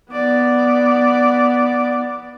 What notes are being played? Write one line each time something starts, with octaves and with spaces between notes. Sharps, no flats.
B3 D5